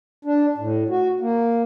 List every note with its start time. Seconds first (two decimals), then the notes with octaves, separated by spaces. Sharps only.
0.25 D4
0.58 A2
0.89 F#4
1.20 A#3